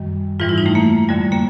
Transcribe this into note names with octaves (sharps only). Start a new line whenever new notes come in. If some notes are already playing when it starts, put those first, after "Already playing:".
Already playing: F#2 D#3 G3
G#2 E3 G3 F4
E4
D#4
A3
A#3
F2 D3 G3
A#3